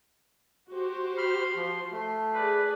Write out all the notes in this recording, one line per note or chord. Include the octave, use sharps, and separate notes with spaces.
F#4 G4 C5
B5 C6 F6
F3
A3
G#4 B4 D5